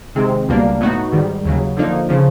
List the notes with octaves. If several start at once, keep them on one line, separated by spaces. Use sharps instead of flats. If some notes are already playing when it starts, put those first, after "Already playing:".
C3 D#3 G#3 C4
C#2 B2 G3 A#3 D4
A2 F#3 B3 D#4 F#4
G#2 D#3 G3
D#2 C#3 F#3
D3 F3 A#3 D#4
C#3 F3